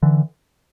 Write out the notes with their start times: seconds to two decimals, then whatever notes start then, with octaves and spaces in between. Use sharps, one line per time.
0.03 D3 E3